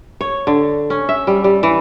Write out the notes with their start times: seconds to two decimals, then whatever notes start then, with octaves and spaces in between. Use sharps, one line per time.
0.21 C#5
0.47 D3
0.90 C#4
1.09 E5
1.27 G3
1.44 G3
1.63 E3